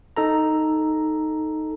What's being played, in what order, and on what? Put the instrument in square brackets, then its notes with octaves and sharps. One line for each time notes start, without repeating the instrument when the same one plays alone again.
[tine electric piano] D#4 A4 A#5